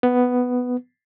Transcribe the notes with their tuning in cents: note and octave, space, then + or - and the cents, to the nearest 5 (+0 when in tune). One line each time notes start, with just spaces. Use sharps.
B3 +5